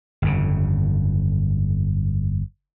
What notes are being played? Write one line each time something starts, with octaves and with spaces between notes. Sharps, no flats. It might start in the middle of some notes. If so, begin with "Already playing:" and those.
G1 F2 C#3